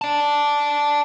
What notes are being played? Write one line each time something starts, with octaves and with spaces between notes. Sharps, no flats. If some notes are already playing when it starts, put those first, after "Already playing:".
D5 A5